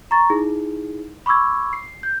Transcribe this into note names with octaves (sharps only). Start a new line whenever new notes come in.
A#5 C#6 A6
D#4 E4 G#4
B5 C#6 D6 E6 G#6
C7
G6